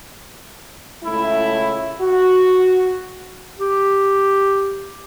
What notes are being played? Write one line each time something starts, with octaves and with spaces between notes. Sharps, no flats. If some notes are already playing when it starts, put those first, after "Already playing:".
C#2 A3 E4
F#4
G4